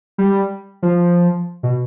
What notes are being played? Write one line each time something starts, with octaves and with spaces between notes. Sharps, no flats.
G3
F3
B2